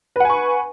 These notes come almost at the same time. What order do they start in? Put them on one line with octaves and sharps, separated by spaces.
B4 F#5 G#5 C#6